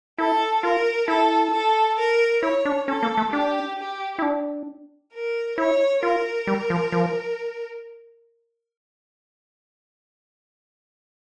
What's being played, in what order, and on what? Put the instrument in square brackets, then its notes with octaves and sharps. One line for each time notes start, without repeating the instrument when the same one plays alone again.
[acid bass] E4 [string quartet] A4
[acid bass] F4 [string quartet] A#4
[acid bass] E4 [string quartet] A4
[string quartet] A4
A#4
[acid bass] E4 [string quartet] C#5
[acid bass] D4
[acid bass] C#4 [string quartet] A4
[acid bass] A#3
A3
[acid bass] D4 [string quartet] G4
[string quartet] G4
[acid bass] E4
D4
[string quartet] A#4
[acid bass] E4 [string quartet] C#5
[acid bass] F4 [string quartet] A#4
[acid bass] G3
F3
F3